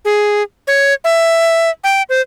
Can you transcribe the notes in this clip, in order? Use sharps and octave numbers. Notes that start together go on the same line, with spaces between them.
G#4
C#5
E5
G5
C5